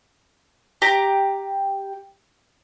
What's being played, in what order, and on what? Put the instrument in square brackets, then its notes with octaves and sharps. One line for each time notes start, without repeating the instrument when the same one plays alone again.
[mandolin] G4 A#5